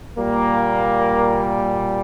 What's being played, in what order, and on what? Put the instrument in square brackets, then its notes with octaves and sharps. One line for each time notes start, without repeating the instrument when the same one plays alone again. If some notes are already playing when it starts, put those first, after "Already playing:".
[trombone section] A#2 G3 A#3